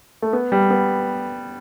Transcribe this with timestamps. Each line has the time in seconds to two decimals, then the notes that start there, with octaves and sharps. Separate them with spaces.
0.22 A3
0.33 B3
0.52 G3
0.70 B3